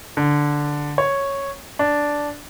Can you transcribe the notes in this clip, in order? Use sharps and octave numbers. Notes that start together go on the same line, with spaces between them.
D3
C#5
D4